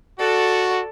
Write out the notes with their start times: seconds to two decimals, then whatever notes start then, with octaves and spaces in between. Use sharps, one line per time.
0.19 F#4 A4 D5